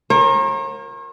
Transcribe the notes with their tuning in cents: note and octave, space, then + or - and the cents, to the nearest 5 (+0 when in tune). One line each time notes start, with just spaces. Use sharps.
F4 +40 A#4 +0 C#5 -45